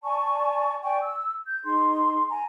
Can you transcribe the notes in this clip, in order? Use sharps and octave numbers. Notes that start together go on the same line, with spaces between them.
D5 G#5 A5 C#6
D5 G5 G#5 C#6
E6
G6
D#4 G#4 C6
G#5 A#5